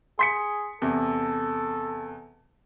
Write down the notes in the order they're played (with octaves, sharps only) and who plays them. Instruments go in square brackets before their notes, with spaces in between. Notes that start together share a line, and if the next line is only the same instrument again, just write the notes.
[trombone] G#4 [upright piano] C6 B6 C#7
[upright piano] E2 C3 [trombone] A4